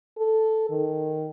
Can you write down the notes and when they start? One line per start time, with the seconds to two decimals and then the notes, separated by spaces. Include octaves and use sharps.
0.18 A4
0.70 D#3